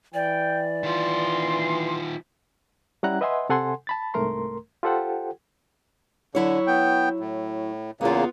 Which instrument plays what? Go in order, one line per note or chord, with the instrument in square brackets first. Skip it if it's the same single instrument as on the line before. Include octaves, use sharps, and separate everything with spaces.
[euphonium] E3 [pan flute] D5 [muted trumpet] G5
[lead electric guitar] D#3 F4 [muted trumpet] C6
[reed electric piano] G3 C#4 E4 F#5 A#5 F#6
B4 D#5 E5 F#5 G#5 C6
C3 A4 F#5 G#5 C6
A5 B5 A6
C2 G#2 A3 A#4 A#5 C6
F4 G4 A4 C5 F#5 G5
[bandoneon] D3 [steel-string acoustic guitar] F#3 E4 C#5
[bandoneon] B3 G5
A2
[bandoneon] E2 C#3 A#3 [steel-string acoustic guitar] B3 F4